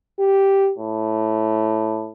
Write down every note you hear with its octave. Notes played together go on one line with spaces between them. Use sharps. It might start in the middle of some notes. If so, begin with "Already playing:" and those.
G4
A2